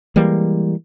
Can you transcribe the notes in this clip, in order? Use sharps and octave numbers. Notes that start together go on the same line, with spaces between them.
E3 G3 G#3 A#3